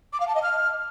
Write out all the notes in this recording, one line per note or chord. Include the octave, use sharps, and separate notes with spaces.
D6
F5
A5
D#5
F6